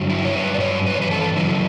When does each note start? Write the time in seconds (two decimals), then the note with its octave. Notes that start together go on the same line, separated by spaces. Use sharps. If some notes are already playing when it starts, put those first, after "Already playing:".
Already playing: G2 D3 F#3
0.10 E4
0.25 C#5
0.35 G2 F#3 B4
0.54 D5
0.60 C#5
0.87 G2 E3 B4
0.94 C#5
1.02 B4
1.11 A4
1.36 F#2 C#3 F#3 E4